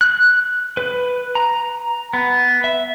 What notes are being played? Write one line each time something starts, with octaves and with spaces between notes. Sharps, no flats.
F#6
B4
A#5
B3
E5